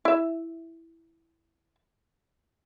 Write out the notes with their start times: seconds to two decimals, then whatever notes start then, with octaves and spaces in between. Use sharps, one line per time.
0.05 E4 E5